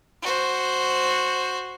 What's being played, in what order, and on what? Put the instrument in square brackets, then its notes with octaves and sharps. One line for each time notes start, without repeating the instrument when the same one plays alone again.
[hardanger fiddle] F#4 C5